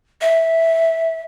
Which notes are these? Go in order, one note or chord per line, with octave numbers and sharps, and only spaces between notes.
E5